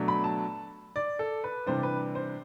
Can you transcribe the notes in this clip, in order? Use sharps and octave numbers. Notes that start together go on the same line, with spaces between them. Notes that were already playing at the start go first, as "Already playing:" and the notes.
Already playing: B2 F#3 A3 D4
B5
A5
D5
A4
B4
C3 E3 G3 D4 C5
B4
C5